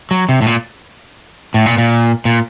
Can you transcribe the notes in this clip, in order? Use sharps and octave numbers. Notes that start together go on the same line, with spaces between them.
F#3
C3
A2
A#2
A2
A#2
A#2
A#2